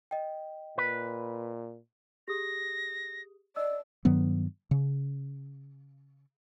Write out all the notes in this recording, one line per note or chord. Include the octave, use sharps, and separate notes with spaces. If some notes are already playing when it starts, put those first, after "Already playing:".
D#5 G5
A#2 B4
G4 G#4 D#6 A#6
D5 D#5 E6
G2 D#3 F#3 B3
C#3